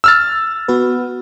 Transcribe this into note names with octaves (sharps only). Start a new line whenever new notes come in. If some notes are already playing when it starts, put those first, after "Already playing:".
E6 F6 A6
B3 F#4 B4